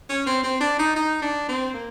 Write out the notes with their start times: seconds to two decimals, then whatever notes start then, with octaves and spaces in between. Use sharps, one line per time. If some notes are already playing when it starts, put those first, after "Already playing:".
0.10 C#4
0.27 C4
0.43 C4
0.61 D4
0.79 D#4
0.96 D#4
1.22 D4
1.49 C4
1.74 A#3